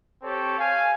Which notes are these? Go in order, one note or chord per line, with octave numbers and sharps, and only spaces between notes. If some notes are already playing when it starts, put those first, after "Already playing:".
C4 G4 A4 C#5
F5 G#5